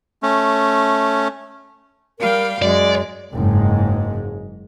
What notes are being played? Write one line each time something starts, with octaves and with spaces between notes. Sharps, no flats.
A3 C#4
G3 A#4 F5 G5
F#2 G#3 D5
F#1 G#2 G#3